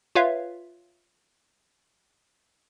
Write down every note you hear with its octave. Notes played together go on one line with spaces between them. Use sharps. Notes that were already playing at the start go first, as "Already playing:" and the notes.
F4 B4 C#5 E5 F5